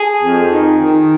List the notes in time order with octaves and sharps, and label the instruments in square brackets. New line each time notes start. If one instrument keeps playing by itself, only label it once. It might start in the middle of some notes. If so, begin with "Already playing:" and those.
Already playing: [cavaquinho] G#4
[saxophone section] F2
D#3
D#3